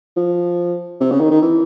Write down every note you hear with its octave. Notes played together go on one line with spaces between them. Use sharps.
F3
C3
C#3
D#3
D#3
E3